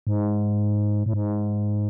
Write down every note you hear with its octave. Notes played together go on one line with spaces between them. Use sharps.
G#2
A2
G#2